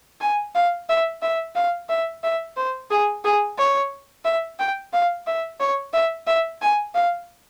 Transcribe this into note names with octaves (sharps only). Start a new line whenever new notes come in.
G#5
F5
E5
E5
F5
E5
E5
C5
G#4
G#4
C#5
E5
G5
F5
E5
C#5
E5
E5
G#5
F5